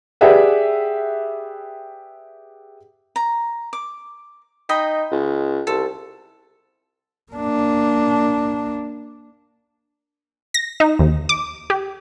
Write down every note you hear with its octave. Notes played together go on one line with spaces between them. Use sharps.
G4 G#4 B4 D5 E5 F#5
A#5
D6
D#4 D#5 G5 B5
C#2
C2 A4
A#3 D4
A#6
D#4
D#2
D6
G4